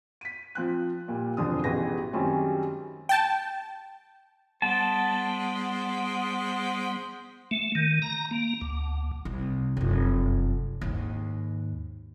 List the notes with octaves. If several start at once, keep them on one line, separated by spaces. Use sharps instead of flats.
B6 D#7
F3 C4 F#6
A#2 G3
E1 F2 D3 F4 D#6
A1 B2 G3 G#4 B4 A#6
F#2 D#3 G3 G#3 C4 C#4
G5 A5
G3 G#3 B3 C5 F#5 A5
A3
D#3
A#5
A#3
D2
C2
F1 F#2
D#2 G#2